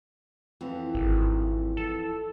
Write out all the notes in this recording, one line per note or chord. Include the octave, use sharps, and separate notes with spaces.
F2 E3 B3
G#1
A4